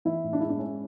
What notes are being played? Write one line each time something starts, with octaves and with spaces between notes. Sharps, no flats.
E3 E4
A2
D4
G#3 E4
D4
G#3 C#4